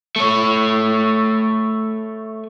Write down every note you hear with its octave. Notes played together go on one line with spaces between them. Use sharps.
A3 C#5